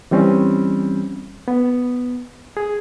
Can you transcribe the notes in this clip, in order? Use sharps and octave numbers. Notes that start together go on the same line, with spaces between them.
E3 G3 C4 C#4
B3
G#4